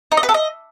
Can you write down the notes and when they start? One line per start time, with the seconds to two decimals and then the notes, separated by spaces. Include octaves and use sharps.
0.12 D#4
0.17 D#5
0.23 B4
0.29 A4
0.34 D#5